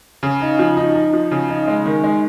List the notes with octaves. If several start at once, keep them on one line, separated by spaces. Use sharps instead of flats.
C#3
D#4
F3
D#4
D#4
F3
C#3
D#4
G#3
D#3
G#3